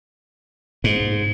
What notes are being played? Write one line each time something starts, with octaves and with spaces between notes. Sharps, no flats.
G#2